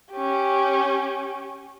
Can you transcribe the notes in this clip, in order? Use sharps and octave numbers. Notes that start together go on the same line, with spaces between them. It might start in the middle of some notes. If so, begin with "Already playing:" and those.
C#4 G4